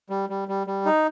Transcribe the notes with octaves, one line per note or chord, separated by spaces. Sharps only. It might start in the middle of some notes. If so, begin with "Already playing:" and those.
G3
G3
G3
G3
D#4